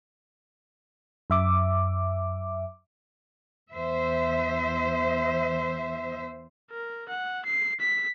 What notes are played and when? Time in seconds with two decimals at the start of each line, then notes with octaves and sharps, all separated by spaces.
1.30 F#2 E5 D6
3.71 E2 C5 E5
6.71 A#4
7.09 F#5
7.46 C7
7.80 B6